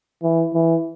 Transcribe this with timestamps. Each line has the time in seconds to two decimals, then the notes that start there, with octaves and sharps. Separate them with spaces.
0.23 E3
0.54 E3